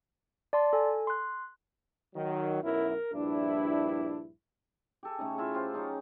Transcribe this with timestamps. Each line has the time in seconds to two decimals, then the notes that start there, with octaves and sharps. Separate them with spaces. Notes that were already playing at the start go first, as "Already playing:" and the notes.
0.53 D5 A5 C6
0.73 A4 G#5
1.07 C6 F#6
2.15 D#3 F#3
2.63 B1 F#2 E4 A#4
3.14 A#1 G2 D4 E4
5.03 G4 A4 G#5
5.19 C#3 A3 C#4 D#4
5.38 E4 F4 E5
5.54 F4 G4 C5 F5
5.73 F#3 C#4 D#4 G#4